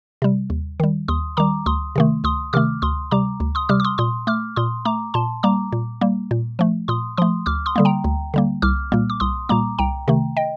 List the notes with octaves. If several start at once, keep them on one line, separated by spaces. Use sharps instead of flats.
C3 G3
D#2
D#3 G3
D#2 C6 D#6
D#3 G3 A#5 D6
D2 C6 D#6
C3 D#3 A3
D2 C6 D#6
C3 D#3 A3 D6 F6
D2 C6 D#6
C3 G3 A#5 D6
D2
C6 D#6
C3 G3 D6 F6
D6
C6 D#6
A#2 C6 D#6
A3 D6 F6
A#2 C6 D#6
A3 A#5 D6
A#2 A5 C6
G3 A#3 A#5 D6
A#2
G3 A#3
A#2
F3 A3
A#2 C6 D#6
F3 A3 C6 D#6
D2 D6 F6
C6 D#6
D3 G3 A#3
G5 A#5
D2
D3 G3 A#3
C2 D6 F6
A#2 G3 A#3
D6
C2 C6 D#6
A#2 G3 A#3 A#5 D6
C2 G5 A#5
C3 D#3 A3
D#5 G5